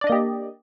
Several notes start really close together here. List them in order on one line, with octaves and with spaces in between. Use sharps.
D5 D4 D#5 A#3 G4